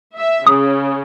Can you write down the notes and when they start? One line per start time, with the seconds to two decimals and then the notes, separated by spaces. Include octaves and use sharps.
0.17 E5
0.47 C#3 D#6